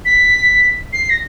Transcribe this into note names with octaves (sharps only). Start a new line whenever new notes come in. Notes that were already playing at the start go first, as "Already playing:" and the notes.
B6
C7
A#6